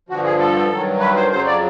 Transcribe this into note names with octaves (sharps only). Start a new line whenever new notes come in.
G2 D3 F3 F#4
G#4
A4
G2 D#3 F#3
B4
C5
F2 C#3 F#3 C5
D5